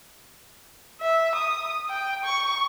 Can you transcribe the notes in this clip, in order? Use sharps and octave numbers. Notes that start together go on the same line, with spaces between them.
E5
D#6
G5
C#6